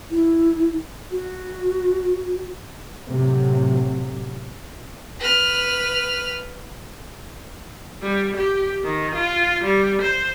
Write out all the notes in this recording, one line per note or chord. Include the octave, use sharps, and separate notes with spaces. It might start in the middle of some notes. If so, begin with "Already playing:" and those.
E4
F#4
A2 C3 F#3
B4 F6
G3
G4
D#3
F4
G3
C5